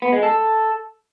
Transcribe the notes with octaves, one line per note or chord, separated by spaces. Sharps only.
B3
G#3
A4